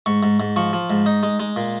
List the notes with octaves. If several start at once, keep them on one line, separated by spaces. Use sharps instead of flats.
G#2 C#6
G#2
G#2
F3 C#6
F3
G#2
D#4
G#3
G#3
A#2